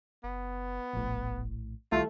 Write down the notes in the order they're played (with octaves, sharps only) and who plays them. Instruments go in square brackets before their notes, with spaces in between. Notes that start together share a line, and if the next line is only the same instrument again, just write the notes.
[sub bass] F#1 [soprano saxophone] B3
[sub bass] F1 [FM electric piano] A#1 A2
[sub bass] C2 [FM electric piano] D#3 G3 E4 [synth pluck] A3 [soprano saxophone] F4